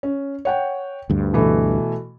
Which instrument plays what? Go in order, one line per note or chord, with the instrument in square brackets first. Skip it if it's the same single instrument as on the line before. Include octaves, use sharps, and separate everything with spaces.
[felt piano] C#4
C#5 F#5 G5
[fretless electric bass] D2 G2
[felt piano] B2 E3 A3